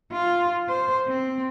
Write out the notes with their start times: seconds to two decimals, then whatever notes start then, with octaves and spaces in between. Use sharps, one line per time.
0.12 F4
0.69 C5
1.07 C4